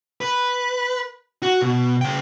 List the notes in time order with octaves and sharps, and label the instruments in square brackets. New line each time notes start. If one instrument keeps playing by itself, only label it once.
[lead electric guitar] B4
F#4
B2
C#3 G5